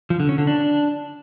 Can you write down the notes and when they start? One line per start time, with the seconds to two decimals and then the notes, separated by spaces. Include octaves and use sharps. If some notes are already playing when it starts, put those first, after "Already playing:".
0.10 F3
0.20 D3
0.29 C#4
0.38 D3
0.47 D4